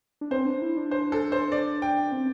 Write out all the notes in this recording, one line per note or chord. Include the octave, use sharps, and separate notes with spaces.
D4
C4 C5
D4
E4
D4
C5
A4
C5
D5
G5
C4